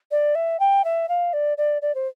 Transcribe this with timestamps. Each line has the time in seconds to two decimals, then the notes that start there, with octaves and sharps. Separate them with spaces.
0.11 D5
0.35 E5
0.60 G5
0.84 E5
1.09 F5
1.33 D5
1.58 D5
1.82 D5
1.95 C5